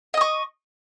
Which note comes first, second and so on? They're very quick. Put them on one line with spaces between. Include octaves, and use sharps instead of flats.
D#5 D#6 C#6